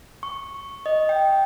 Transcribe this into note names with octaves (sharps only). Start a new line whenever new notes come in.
C#6
D#5
G5